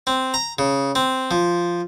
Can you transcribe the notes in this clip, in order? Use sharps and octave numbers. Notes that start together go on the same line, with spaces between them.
C4
A#5
C#3
C4
F3